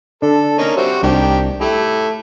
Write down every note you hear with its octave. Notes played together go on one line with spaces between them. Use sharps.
D3 D4 A4
A#3 C#4 D#4
G3 C4 F#4 C5 E5
C2 D#3 D4 G4 G5
A3 E4 G4